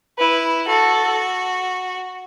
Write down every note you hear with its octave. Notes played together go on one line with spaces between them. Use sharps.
E4 B4
F#4 A4